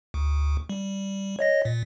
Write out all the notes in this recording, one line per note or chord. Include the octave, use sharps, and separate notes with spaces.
D2
G3
C#5 D#5 A#6
A#2